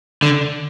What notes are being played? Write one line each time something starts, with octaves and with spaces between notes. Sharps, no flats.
D3